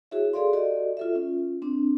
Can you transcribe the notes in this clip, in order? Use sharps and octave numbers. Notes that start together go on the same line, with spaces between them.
E4 F#4 G#4 C#5 E5
G#4 A4 D5 F5 C6
F#4 G4 A4 D5 D#5
F4 A4 E5
C#4 F4
C4 D4